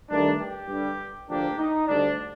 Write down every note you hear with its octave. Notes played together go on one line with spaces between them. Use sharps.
G2 D#3 A3 D4
G4
G2 D3 G3
D2 D3 F3 A#3 D4 G4
D#4
D2 D3 G3 D4